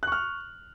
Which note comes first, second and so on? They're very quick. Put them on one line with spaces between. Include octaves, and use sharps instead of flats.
F#6 C#6 F6